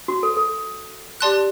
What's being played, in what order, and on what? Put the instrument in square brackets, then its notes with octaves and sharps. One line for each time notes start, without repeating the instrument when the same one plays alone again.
[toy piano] F#4
A4
A4
[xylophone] G4 D5 A5 C6 F#6